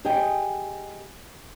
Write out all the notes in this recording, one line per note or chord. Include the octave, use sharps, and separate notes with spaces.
G4 G#4 D#5 G5 G#5